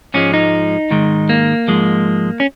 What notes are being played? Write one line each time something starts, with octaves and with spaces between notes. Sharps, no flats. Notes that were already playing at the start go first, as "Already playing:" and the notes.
G#2 F3 G#3 C#4
D#4
G#2 D#3 G#3
A#3
G#2 F3 G#3
C#4